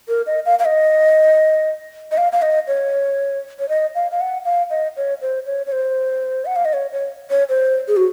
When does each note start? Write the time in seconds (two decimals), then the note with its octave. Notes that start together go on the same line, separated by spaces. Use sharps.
0.09 A#4
0.27 D#5
0.46 F5
0.59 F5
0.65 D#5
2.11 D#5
2.17 F5
2.32 F5
2.42 D#5
2.67 C#5
3.59 C#5
3.69 D#5
3.95 F5
4.11 F5
4.21 F#5
4.45 F5
4.70 D#5
4.97 C#5
5.22 C5
5.46 C#5
5.66 C#5
5.72 C5
6.46 F#5
6.56 F5
6.65 D#5
6.73 C#5
6.92 C#5
7.30 C#5
7.49 C5
7.88 G#4
7.97 F#4